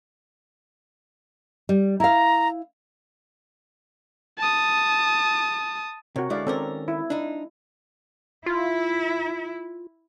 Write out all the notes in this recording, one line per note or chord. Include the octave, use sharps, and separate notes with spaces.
G3
E4 F5 A#5
A5 D#6
C3 F#4 A#4 C#5
C#2 D3 G#3 E4 D5 F5
D#3 C4 C#4 A4 A#4 D5
E4
D4 D#4
E4 F4 E5